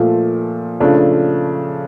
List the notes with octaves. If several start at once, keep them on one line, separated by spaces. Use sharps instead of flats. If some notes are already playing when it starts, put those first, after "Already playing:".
Already playing: A#2 F3 A3
C#3 F3 A3 D4